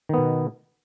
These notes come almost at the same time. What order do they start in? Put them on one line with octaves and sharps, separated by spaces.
D#3 B3 B2